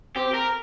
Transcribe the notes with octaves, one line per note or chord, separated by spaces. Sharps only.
C4 G4
A#4